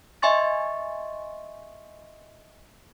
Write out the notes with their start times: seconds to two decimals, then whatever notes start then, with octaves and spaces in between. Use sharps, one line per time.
0.22 D#5 E5 G#5 C6 C#6 A6